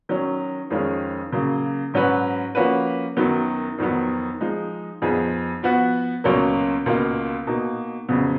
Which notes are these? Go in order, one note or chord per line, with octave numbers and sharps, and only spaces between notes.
D#3 F#3 C#4
F2 D#3 G#3 C#4 F4
C#3 F#3 A#3
G#2 F#3 C#4 F#4 B4
F3 A#3 C#4 F#4 B4
F#2 D#3 F#3 B3
F2 D#3 F#3 B3
F3 G#3 D#4
F2 F3 B3 D#4 G#4
F3 B3 F#4
C#2 B2 F#3 A#3 C#4
C#2 B2 A#3 F4
B2 A#3 D#4
F2 C#3 F#3 B3